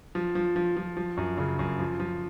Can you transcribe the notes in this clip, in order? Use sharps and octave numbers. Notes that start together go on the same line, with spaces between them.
F3
F3
F3
F3
F3
F#2
C#3
F#2
F3
F3